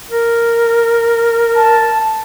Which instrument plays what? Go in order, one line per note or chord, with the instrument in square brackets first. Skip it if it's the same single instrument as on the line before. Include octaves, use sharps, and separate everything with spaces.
[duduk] A#4
[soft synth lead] A5